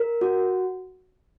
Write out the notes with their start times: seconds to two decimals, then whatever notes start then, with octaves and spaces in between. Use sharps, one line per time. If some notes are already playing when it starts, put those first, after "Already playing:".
Already playing: A#4
0.21 F#4